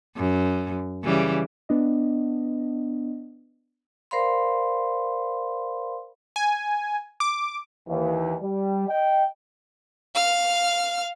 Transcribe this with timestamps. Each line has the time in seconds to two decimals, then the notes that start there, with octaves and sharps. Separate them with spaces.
0.16 F#2
1.04 C#3 E3 G3
1.69 B3 D4 D#5
4.11 A#4 C5 D5 F5 B5 C6
6.36 G#5
7.20 D6
7.88 D#2 E3
8.42 G3
8.88 D#5 G5
10.15 F5 F6